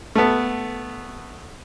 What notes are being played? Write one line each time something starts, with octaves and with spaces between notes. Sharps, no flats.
A3 B3